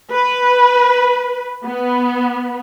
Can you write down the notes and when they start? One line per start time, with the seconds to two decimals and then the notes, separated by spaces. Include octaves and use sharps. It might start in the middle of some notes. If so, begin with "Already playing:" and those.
0.11 B4
1.65 B3